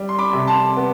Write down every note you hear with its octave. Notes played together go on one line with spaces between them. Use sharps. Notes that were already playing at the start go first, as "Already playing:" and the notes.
Already playing: G3
C6
B5 D6
C3
A5 C6
B3